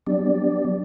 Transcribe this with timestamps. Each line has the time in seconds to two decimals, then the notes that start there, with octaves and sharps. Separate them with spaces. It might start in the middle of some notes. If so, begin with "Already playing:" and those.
0.07 F#3 B3 D4 G4 D5